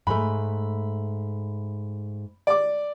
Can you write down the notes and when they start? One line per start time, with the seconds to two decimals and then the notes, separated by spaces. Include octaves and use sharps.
0.07 G#2 A3 B5
2.47 D5 D6